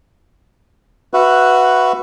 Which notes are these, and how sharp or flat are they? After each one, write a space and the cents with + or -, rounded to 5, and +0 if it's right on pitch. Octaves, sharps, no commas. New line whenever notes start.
F#4 +0 B4 +0 E5 +20